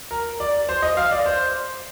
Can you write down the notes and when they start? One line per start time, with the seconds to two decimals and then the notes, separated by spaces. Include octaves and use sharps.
0.11 A#4
0.40 D5
0.69 C5
0.82 D#5
0.97 F5
1.11 D5
1.26 C5